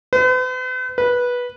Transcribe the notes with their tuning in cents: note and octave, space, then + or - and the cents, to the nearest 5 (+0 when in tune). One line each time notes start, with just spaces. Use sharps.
B4 +45
B4 -15